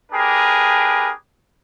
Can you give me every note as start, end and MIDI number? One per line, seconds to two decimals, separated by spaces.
0.12 1.10 62
0.12 1.10 67
0.12 1.10 68
0.12 1.10 70
0.12 1.10 71